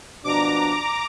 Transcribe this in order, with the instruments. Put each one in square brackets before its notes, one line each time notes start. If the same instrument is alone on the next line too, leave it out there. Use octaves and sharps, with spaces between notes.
[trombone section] B2 F3 D4 [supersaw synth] A#5 D6